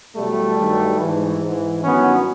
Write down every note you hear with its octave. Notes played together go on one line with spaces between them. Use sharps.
E2 B2 F#3 G3 A3
G2 D#3 F#3
G#2 E3
G#2 E3
G2 D#3 F#3 B3 C#4